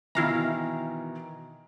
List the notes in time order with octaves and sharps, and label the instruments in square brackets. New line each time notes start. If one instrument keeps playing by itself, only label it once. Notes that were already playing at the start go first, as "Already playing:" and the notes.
[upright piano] B2 D#3 E3 [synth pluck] E4 F5 A#5